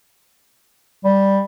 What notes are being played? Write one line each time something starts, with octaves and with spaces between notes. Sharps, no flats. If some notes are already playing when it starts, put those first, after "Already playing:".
G3